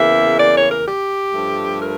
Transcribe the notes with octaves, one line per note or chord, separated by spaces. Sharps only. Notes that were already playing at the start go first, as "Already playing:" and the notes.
Already playing: E2 C#3 E3 A#3 E5
D5
C#5
A#4
G4
G2 F3 A3
A#4